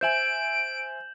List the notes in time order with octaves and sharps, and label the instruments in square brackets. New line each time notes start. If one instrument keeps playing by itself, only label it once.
[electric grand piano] C5 E5 G#5 [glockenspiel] G6 E7 F#7 [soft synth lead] D7